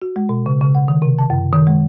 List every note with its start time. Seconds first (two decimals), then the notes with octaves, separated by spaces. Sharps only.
0.02 F#4
0.16 G#3
0.29 B2
0.46 C#3
0.61 C#3
0.75 F#5
0.88 D#3
1.02 C3
1.19 A5
1.30 F#2
1.52 D#3
1.67 G#3